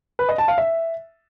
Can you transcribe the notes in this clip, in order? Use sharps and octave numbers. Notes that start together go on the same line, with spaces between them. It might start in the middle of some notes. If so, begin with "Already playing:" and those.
B4
D#5
A5
F5
E5